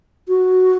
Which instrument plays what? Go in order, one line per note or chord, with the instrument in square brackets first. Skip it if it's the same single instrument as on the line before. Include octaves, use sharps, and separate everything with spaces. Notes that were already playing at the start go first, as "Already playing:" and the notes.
[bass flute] F#4